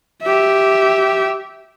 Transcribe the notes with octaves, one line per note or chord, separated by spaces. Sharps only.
G4 E5